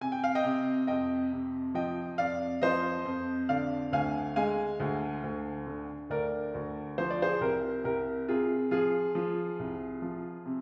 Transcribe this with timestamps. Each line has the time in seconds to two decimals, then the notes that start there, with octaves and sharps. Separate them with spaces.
0.01 C3 G#5
0.12 G5
0.24 F5
0.35 D#5 G5
0.44 C3
0.87 F2 D#5 G5
1.32 C3
1.74 F3 D#5 G5
2.18 F2 D5 F5
2.62 F3 C5 D#5
3.05 F2
3.49 D3 D5 F5
3.92 D2 F5 G#5
4.36 G#3 F5 G#5
4.80 D2
5.24 D2
5.67 D3
6.10 D2 A#4 D5
6.54 D2
6.98 F3 C5
7.10 D5
7.22 G#4 C5
7.41 C2 G4 A#4
7.84 C2 G4 A#4
8.28 C3 F4 G#4
8.71 F3 F4 G#4
9.15 F3
9.59 C2
10.02 F3
10.46 C3